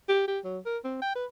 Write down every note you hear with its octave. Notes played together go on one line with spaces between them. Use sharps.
G4
G4
F#3
A#4
C4
G5
B4